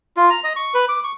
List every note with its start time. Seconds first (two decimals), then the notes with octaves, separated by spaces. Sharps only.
0.17 F4
0.30 A#5
0.44 D#5
0.56 C#6
0.74 B4
0.89 D6
1.04 C#6